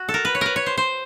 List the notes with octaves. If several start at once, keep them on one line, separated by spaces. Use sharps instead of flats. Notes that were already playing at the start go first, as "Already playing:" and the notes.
Already playing: F#4
A4
A#4
B4
C#5
A#4 B4
C#5
C5
C5